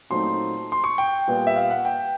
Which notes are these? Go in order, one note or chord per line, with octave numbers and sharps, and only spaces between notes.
A#2 F#3 A3 C4 D#4 C6
C6
C#6
G5
A#2 G3 B3
E5
F5
F#5
G5